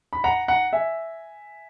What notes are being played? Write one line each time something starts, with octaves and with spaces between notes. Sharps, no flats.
B5
F#5 A#5
F#5 A#5
E5 G#5